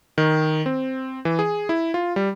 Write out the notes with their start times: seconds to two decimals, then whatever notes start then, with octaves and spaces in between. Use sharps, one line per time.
0.18 D#3
0.66 C4
1.25 E3
1.39 G#4
1.69 E4
1.94 F4
2.16 G3